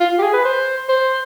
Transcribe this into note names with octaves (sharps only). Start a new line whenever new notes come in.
F4
G4
G#4
B4
C5
C5